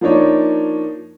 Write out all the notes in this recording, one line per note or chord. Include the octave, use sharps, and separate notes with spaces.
F3 A#3 D4 D#4 C#5